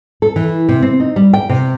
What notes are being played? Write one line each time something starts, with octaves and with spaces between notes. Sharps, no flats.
A4
E3
C3
C4
D#4
G3
G5
C3